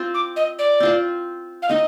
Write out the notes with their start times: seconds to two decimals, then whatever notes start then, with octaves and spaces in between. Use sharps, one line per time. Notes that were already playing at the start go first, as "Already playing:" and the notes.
Already playing: C4 F4 C5
0.14 D6
0.36 D#5
0.59 D5
0.80 C4 F4 C5
1.62 F5
1.69 C4 D#4 D#5